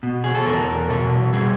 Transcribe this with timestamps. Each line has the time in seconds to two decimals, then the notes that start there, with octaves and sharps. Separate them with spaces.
0.03 B2
0.24 G#4
0.35 A4
0.46 E2 A#4
0.90 B2 A4
1.33 G3 G#4